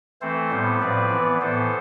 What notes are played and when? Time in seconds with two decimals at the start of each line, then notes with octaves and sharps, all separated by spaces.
0.21 E3 A3 C4 A4 C5
0.51 A2 G3 B3
0.81 A2 F3 C4 B4 D5
1.11 E3 B3
1.41 A2 E3 B3 A4 C5